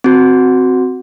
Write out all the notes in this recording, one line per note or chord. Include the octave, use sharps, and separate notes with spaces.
C4 F#4